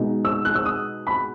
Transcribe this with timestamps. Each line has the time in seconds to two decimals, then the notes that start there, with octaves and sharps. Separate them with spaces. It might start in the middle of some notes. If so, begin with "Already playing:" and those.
Already playing: B2 G#3 D#4
0.25 E6
0.45 F#6
0.55 E6
0.65 D#6
1.07 B5